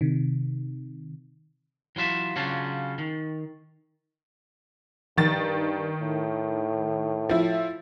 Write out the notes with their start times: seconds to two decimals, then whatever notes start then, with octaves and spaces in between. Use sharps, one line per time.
0.01 C3 D#3
1.96 E3 F#3 F4 E5
2.36 C#3 F#3 C#4 D4 F4
2.98 D#3
5.17 G2 D#3 A6
6.01 A2
7.29 F3 E4